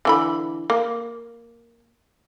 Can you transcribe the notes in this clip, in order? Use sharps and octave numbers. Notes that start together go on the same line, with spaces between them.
D3 E3 B5
A#3